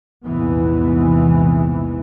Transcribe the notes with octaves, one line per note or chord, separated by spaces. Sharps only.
A#1 E2 G#2 C3 E3 B3